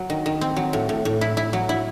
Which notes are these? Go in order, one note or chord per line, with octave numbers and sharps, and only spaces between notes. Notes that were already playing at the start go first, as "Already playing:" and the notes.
Already playing: F#3
D#3
D#3
C4
F#3
A2
A2
A2
E4
E4
F#3
E4